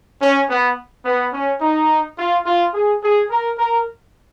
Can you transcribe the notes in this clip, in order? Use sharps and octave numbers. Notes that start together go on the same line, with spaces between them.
C#4
B3
B3
C#4
D#4
F4
F4
G#4
G#4
A#4
A#4